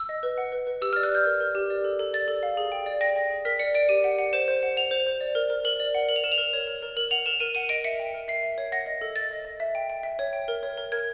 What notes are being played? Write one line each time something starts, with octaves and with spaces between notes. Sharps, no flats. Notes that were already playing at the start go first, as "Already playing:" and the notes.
Already playing: E6
D#5
B4
F#5
B4
B4
G4 E6
D5 F6
F#6
D5 G6
A#4
A#4
G4
D5
A4
A4
D5 A6
A4
F5
G#4
G5
D5
G5 A#6
G5
G#4
A#4 B6
D5 C#7
D5 D7
G4 D#7
F#5
F#5
C5 E7
C5
F#5
F#5 F7
C5
C5
D5
A#4
A#4
A#4 F#7
D5
F#5
A#4 F#7
F7
A#4 E7
F7
A#4
C#5
A#4
A#4
A#4 F#7
F#5 F7
A#4 E7
A#4 D#7
F#5 D#7
D#5 D7
E5 C#7
G5
A#4
E5 C7
E5
C#5
F#5 A#6
D#5
A4
D#5 A6
D#5
D#5
E5
G5
G5
E5
C#5
G5
A#4
C#5
A#4
A#4 G#6